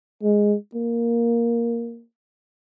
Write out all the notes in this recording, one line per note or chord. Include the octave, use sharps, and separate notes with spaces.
G#3
A#3